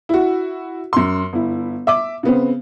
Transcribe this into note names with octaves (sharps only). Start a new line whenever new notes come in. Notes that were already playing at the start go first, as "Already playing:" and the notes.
E4 F#4
F#2 C6
G1 E4
E5 D6
C#3 B3 C4